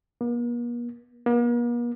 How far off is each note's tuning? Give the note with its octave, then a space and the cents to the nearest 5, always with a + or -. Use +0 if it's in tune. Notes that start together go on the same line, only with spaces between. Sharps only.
A#3 +45
A#3 +45